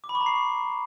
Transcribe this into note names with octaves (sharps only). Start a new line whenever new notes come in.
D6
B5
C#6
A#5
C7